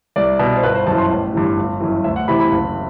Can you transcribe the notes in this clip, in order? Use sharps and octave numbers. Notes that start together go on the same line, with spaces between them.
C2 D5
B2
C5
G1 B4
C5
F#2 A5
E3
C6
A1
G2 E3
G1
F#2 E3
D2 E5
F#5
C3 E3 B5
B5
F#1